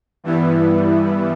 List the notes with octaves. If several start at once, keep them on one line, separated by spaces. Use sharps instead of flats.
G2 E3 G3 B3 E4